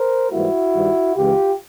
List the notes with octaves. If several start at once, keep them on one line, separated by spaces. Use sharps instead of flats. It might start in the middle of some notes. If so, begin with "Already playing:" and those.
Already playing: A#4 C5
G#2 E3 G3 A#3 E4 F#4
G2 D#3 G3
C#2 C#3 E3 G#3 F4 G4